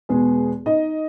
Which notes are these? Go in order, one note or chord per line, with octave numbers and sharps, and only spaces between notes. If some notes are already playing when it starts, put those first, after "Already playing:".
E2 B2 G#3 B3 G#4
D#4 D#5